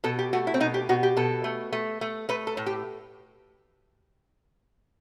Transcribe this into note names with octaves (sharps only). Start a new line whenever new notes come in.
B2 A4
G4
A3 F#4
E4
C4
B2 D#4
G4
B2 F#4
G4
B2 A4
A3
A3
A3
A3 B4
A4
A2
G4